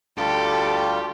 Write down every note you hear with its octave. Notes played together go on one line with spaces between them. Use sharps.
D2 G3 F4 G4 A4